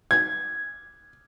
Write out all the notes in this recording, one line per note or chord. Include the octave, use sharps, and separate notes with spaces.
G#6